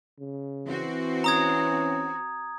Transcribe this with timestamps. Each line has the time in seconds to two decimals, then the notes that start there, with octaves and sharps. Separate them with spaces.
0.19 C#3
0.66 E3 C4 F#4
1.24 C#4 A#5 D#6 G#6